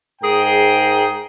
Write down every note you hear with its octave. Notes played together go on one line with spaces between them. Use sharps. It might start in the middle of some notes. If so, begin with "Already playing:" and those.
G#2 G#4 A#4 G5